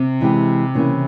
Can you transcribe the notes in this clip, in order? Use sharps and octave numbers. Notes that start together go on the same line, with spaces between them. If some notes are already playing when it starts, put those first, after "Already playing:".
Already playing: C3
E3 G#3 E4 G4
C#3 E3 A#3 E4